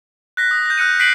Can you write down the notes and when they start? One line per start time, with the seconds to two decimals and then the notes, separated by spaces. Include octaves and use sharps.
0.37 F#6 A#6 B6
0.51 D#6
0.66 G6 A#6
0.77 F6 F#6 C#7 D#7
0.99 F#6 B6 C7 D7 D#7 F#7